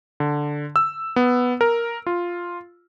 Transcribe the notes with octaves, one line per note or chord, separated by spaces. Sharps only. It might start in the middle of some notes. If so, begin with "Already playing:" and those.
D3
E6
B3
A#4
F4